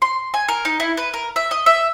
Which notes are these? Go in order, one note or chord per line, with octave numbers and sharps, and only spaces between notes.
C6
G#5
A#4
D#4
E4
B4
A#4
E5
D#5
E5